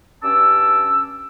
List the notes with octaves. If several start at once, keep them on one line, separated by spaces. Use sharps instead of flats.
G2 C#4 A5 D6 E6